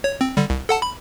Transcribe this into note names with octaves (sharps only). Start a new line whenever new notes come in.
C#5
C4
D3 G3
C2
A4 F#5 A5
B5